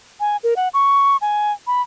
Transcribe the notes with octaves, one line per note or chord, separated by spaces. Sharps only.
G#5
A#4
F#5
C#6
G#5
B5